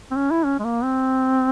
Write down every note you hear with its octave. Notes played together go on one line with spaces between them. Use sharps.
C4
C#4
E4
C#4
G#3
A#3
C4